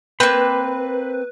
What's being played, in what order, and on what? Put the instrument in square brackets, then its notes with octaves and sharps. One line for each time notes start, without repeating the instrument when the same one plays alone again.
[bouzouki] A#3 C4 [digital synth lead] B4 [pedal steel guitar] B5